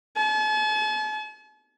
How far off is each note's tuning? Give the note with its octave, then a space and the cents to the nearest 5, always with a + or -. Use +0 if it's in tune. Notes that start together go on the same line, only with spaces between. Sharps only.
A5 -45